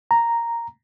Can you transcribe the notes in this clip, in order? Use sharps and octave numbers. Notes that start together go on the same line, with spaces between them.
A#5